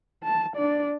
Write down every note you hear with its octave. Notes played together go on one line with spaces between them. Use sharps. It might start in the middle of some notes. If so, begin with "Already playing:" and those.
A5
D4 D5